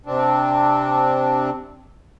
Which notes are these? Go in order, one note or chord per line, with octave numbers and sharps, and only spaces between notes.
C3 C4 D4